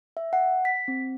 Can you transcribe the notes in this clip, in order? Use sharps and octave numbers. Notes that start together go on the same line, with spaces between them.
E5
F#5
B6
C4